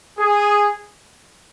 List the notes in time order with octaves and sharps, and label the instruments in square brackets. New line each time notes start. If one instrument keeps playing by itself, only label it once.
[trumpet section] G#4